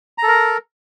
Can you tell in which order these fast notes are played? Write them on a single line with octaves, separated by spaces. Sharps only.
A#5 A4 A#4